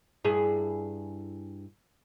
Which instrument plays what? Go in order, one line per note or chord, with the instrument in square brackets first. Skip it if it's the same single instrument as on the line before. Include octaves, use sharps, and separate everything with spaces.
[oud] G2 E4 G#4